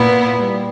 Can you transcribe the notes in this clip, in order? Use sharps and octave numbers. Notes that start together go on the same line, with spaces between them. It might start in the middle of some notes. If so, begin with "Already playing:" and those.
Already playing: A#2 B3 E4
G3